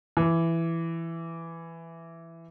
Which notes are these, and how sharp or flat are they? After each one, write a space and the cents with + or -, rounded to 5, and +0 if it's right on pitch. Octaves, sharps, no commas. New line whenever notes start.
E3 +10